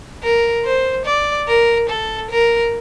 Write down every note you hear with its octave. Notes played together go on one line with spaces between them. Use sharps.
A#4
C5
D5
A#4
A4
A#4